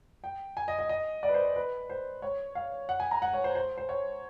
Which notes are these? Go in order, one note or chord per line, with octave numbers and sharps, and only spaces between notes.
G5
G#5
D#5
D#5
D#5
D5
B4
C5
C5
B4
C5
C#5
F5
F#5
G#5
A#5
F#5
C#5
C5
C5
C5
C#5